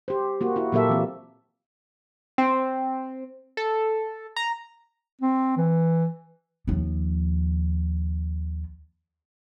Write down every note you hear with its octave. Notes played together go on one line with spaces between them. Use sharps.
G4 C5
A#3 F#4
E4 F#4
A#2 F#3 A#3 G4 A4 E5
E3 C4
C4
A4
A#5
C4
E3
D#2 F3